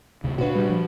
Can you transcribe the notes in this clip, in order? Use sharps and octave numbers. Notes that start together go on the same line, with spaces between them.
D2 C3
A#2 D4 F#4 B4
G3
F3